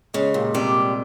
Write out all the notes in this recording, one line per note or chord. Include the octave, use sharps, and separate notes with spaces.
C#3 G#3
D#2 A#2
C3 G3